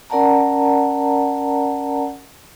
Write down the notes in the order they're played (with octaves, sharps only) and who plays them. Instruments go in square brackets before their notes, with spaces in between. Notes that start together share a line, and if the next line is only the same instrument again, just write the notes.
[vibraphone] C#4 A#4 D5 F#5 A5 A#5